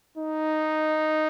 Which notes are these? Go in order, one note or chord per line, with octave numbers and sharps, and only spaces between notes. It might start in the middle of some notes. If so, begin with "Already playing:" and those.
D#4